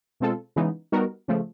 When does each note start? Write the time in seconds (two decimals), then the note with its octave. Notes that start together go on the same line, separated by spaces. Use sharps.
0.20 B2 G#3 C4 F4 A4
0.56 C#3 E3 G#3 B3 D#4
0.92 G3 B3 D#4 F#4 A#4
1.28 C#3 F3 A3